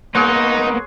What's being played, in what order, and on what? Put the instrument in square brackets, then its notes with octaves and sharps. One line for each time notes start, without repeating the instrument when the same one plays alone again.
[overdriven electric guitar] A#3 B3 [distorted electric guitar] D#4 [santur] G#4 C#5 [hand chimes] C6 F#6